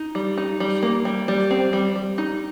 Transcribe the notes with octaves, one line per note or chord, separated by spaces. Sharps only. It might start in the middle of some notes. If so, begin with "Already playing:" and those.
Already playing: D#4
G3
D#4
G3
A#3
G3
G3
C4
G3
G3
D#4